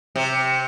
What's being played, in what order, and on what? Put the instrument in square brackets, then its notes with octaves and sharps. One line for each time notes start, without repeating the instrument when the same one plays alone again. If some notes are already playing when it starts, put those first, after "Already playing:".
[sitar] C3